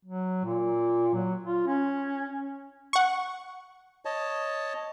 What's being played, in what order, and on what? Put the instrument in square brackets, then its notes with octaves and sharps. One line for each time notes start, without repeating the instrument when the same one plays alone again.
[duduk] F#3
A#2
F#3
F4
C#4
[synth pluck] F#5 C#6
[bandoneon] C#5 D#5 A5